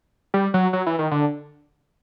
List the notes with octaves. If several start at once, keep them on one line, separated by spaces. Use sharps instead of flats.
G3
F#3
F#3
E3
D#3
D3